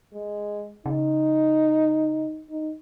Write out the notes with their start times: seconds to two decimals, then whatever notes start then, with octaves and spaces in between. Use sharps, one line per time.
0.13 G#3
0.86 C#3 D#4
2.49 D#4